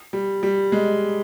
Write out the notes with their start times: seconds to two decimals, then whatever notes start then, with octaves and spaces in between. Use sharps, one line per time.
0.13 G3
0.43 G3
0.72 G#3